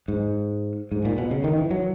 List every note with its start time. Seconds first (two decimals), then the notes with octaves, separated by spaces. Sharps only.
0.08 G#2
0.92 G#2
1.05 A#2
1.18 B2
1.31 C#3
1.44 D#3
1.57 E3
1.71 F#3